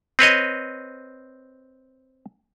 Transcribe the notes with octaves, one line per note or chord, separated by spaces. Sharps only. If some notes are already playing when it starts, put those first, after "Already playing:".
C4 B4 C#5 D#5